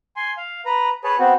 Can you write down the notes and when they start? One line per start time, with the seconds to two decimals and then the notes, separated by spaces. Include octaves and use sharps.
0.16 G#5 C6
0.37 F5
0.66 B4 A#5
1.04 G#4 B4 C#5 A5
1.19 B3 C4 F#4